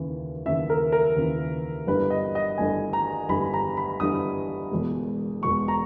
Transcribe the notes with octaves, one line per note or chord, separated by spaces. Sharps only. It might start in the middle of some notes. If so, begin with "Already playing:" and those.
Already playing: D#2 C#3 E3
D#2 C#3 E3 E5
A#4
A#4
D#2 C#3 E3
G1 G2 E3 G3 B4
D#5
D#5
G1 G2 E3 G3 G#5
A#5
G1 G2 E3 G3 B5
A#5
B5
G1 G2 E3 G3 D#6
E1 E2 B2 G#3
E1 E2 B2 G#3 C#6
A#5